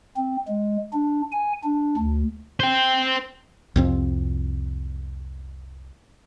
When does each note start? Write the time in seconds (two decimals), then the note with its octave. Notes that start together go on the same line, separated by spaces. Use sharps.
0.17 C4
0.48 G#3
0.93 D4
1.32 G#5
1.63 D4
1.97 D2
2.60 C5 G5
3.76 C2 F2 C4